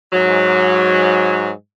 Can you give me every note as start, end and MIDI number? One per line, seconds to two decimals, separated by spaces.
0.13 1.50 44
0.13 1.50 54